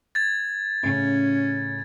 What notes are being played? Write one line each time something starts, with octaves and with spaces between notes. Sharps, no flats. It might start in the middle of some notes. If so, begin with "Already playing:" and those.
G#6 A6
A2 C#3 C#4